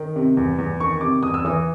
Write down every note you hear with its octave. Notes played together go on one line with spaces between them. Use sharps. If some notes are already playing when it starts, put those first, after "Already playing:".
Already playing: D#3
C3
E2
E2
D#3 C#6
C3 D6
E2 D#6
E6
E3 D#6